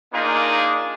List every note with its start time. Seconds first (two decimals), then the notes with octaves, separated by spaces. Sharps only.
0.13 A#3 D4 D#4 F4 G#4